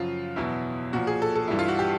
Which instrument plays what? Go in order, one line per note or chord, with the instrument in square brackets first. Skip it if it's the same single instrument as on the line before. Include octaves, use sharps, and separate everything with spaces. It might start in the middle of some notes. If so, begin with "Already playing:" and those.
Already playing: [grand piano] F#2 C#3 F3 F4
E2 B2 F#3 E4
A#2 F3 F#4
G#4
A4
A4
G2 E3 G3 E4
F4
F#4
G4